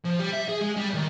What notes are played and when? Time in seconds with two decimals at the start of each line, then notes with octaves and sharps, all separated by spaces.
0.05 F3
0.20 G3
0.33 E5
0.49 G#4
0.62 G#3
0.77 G3
0.94 D#3